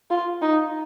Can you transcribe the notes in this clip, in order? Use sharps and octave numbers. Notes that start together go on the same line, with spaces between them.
F4
D#4